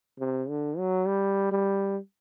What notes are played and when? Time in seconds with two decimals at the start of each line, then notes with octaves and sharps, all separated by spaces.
0.19 C3
0.49 D3
0.78 F#3
1.07 G3
1.52 G3